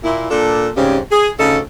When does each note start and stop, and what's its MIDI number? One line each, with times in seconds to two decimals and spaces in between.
0.03 0.27 46
0.03 0.27 64
0.30 0.68 46
0.30 0.68 62
0.30 0.68 65
0.30 0.68 69
0.75 0.98 44
0.75 0.98 49
0.75 0.98 55
0.75 0.98 60
0.75 0.98 61
0.75 0.98 67
1.12 1.29 68
1.38 1.58 38
1.38 1.58 49
1.38 1.58 63
1.38 1.58 69